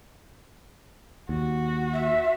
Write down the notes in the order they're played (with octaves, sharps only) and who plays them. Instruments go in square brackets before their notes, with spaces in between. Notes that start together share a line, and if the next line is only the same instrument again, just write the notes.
[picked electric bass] D#2 [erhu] F#4
[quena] E5